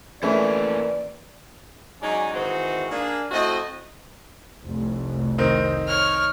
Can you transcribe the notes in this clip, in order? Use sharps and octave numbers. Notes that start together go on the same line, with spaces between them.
E3 A3 A#3 C#4 E4 D5
F#3 G#3 C#4 D#4 D5 G#5
G#2 D#3 E3 C4 D#4 F#4
A#3 D4 G#4
A3 C4 E4 F#4 D#5
F1 C2
D#3 C4 D#4
C#5 F6